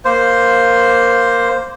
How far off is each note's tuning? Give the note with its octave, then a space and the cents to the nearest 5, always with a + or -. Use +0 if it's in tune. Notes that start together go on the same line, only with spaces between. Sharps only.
A#3 +0 C5 +0